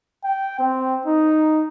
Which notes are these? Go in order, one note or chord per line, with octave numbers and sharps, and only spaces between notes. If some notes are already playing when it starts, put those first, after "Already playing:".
G5
C4
D#4